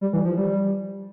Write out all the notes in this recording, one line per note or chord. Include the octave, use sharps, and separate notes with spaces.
G3
E3
F3
G3